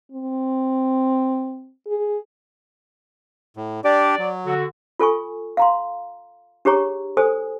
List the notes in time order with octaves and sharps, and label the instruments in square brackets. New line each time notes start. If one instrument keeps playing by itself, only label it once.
[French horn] C4
G#4
[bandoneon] A2
[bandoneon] D4 G4 [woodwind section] D5
[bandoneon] F#3
[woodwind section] D3 F#4
[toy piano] F4 A4 G#5 C#6
F5 A#5 C6
D4 G4 G#4 C#5 A#5 C#6
A4 C5 G#5 D#6